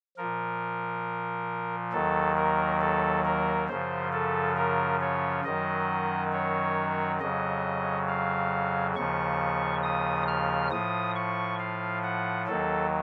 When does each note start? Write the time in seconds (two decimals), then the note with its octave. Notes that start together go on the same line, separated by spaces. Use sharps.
0.17 A#2 F3 A#4
1.93 D#2 D#3 F#3 A4
2.37 A#4
2.81 A4
3.25 A#4
3.68 F#2 C#3 F3 C5
4.13 A4
4.56 A#4
5.00 C#5
5.44 F#2 D#3 F#3 D#5
6.32 C#5
7.20 F2 C#3 F#3 D#5
8.08 F5
8.96 D#2 C#3 F3 C#6
9.84 D#6
10.28 F6
10.71 A2 F3 D#6
11.15 C#6
11.59 F5
12.03 F#5
12.47 D#2 D#3 F#3 A4